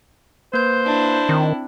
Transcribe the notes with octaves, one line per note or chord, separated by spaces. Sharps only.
A#3 B4 C5 G6
D4 E4
D#3 C4